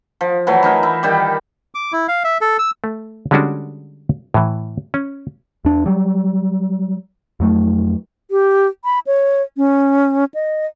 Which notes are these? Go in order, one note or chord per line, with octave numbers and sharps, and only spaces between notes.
F3
E3 F#3 A3
E3 D#4 A#4
E4
D#3 G3 G4
D6
E4
F5
E5
A4
E6
A3
D3 G3 G#3 C#4 D4 F#4
A2 E3
C#4
E2 D4
F#3 G3
F2 F#3 A3
G4
B5
C#5
C#4
D#5